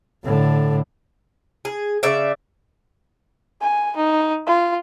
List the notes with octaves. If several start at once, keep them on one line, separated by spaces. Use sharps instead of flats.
A2 D3
G#4
C#3 D5 E5
G#5
D#4
F4